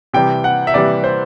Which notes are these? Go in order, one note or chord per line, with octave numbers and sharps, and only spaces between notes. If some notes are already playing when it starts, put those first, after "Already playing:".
C3 E3 G3 G5
F#5
E5
C3 E3 G3 D5
C5